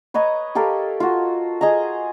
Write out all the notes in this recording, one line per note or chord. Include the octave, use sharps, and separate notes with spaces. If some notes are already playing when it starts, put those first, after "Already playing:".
B4 C#5 D#5 A#5
G4 A4 A#4 F5
F4 F#4
G#4 D#5 G#5 A#5